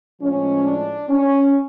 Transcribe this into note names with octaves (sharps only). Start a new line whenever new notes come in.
A2 F3 G#3 C#4
D4
C#4